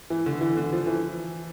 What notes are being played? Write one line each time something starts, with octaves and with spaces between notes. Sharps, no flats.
E3
D3
E3
D3
F3
E3